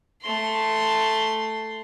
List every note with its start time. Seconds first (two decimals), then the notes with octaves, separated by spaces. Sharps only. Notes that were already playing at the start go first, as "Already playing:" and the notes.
0.22 A3 C6